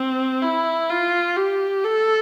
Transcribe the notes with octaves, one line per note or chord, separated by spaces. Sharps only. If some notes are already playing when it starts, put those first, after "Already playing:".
Already playing: C4
E4
F4
G4
A4